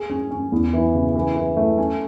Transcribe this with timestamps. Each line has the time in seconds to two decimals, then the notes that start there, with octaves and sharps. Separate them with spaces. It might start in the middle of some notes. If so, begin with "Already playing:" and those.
Already playing: G#4
0.10 C#4
0.31 C#4
0.52 E2
0.73 E3
0.95 C#3
1.16 E3
1.36 E3
1.57 A3
1.78 C#4